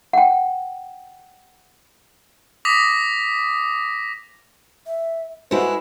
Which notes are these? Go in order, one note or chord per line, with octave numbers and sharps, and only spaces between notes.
F#5 G5
D6 D#6 A#6 B6
E5
G#3 E4 F#4 A4 B4 C5